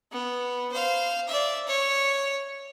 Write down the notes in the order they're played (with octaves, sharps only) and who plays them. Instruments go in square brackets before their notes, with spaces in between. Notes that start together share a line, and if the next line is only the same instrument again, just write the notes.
[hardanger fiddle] B3
C5 F5
D5 E5
C#5